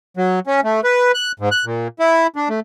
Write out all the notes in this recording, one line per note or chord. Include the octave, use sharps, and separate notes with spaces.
F#3
C#4
A3
B4
F#6
G#2
F#6
A#2
E4
D4
A3